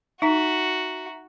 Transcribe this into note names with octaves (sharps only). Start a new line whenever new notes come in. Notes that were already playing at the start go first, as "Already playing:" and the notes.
D#4 F#4 E5 A#5 B6